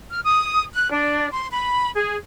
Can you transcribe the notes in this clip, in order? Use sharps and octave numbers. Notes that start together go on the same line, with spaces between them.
F6
D#6
F#6
D4
C6
B5
G#4